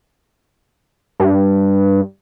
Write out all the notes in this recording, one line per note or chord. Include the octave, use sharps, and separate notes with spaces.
G2